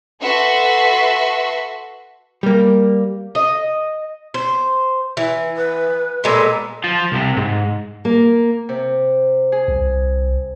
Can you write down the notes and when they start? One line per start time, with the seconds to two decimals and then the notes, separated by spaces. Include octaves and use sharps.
0.21 F#4 A4 B4 E5 C6 C#6
2.43 G3 A#3
3.35 D#5
4.34 C5
5.17 E3
5.57 B4
6.24 A#2 G#3 B3 A4
6.84 F3 F4
7.12 C2 C3
7.37 G#2
8.05 A#3
8.69 C3
9.52 G#4
9.68 C2